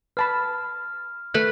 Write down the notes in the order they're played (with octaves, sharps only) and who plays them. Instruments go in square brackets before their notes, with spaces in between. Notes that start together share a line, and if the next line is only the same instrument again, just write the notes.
[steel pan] B4 A5 B5 [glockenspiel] F6
[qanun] A3 B4 B5 [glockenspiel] F#6